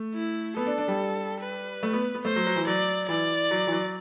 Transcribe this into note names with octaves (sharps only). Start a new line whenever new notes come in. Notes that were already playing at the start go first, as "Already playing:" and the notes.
Already playing: A3
E4
B3 A4
D4
D4
G3
B4
A3
B3
B3
A3 C5
F#3
F#3
E3
F#3 D5
E3 D5
F#3
E3
F#3